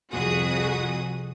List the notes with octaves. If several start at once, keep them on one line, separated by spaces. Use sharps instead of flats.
C2 F2 F#4 G#4 D#6